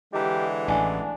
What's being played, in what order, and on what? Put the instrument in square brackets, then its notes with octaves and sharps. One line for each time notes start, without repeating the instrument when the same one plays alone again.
[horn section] D3 E3 G#3 [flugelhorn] G4 [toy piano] D#5 A#5
[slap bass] A1 [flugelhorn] D4 [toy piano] D#5 G#5